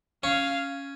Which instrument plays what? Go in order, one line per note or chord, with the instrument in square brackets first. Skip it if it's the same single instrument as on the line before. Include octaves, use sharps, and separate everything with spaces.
[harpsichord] C#4 [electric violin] F5